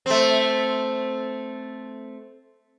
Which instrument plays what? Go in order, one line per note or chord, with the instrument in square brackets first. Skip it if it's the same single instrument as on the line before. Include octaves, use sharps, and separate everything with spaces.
[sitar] A3 C4